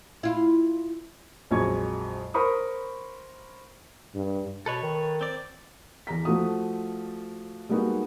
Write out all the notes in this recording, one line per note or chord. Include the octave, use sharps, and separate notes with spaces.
E4 F4
A#1 F2 F#3 G#3 C#6 G#6
A#4 C5 B5 C#6 D#6
G2
B2 A4 B4 C#5
D#3
C4 D5
E2 A#5 B6
F3 A3 F#4 D#6
G3 G#3 A#3 B3 D#4 F#4